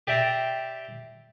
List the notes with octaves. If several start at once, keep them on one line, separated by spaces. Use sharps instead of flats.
G4 D5 E5 G5 A#5 C6